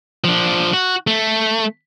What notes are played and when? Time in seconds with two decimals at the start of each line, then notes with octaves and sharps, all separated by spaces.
0.24 F3 D4
0.73 F#4
1.07 A3